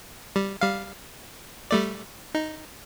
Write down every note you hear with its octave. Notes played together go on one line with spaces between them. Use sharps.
G3
G3 F5
G3 A3 D5
D#4